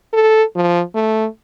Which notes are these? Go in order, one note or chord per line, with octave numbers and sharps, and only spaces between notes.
A4
F3
A3